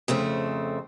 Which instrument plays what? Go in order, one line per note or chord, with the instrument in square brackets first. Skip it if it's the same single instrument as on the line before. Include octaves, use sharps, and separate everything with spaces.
[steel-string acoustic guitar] F2 C#3 A3 C4